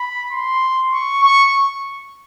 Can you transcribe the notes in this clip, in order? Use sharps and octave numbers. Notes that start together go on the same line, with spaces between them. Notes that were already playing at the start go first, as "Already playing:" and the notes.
Already playing: B5
C6
C#6
C#6